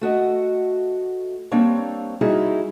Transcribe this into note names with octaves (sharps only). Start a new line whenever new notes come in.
A3 F#4 D#5
G3 A#3 C4 D4 C#5
G3 C#4 D#4 E4 F#4 G#4